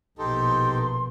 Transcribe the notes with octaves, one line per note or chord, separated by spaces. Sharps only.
A#1 B2 D#4 G4 A4 C6